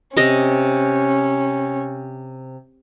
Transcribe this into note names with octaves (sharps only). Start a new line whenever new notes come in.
C3 C#4 D#5